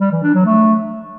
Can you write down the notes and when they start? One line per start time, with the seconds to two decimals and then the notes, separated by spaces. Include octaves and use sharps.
0.01 G3
0.12 E3
0.23 D4
0.34 F#3
0.45 A3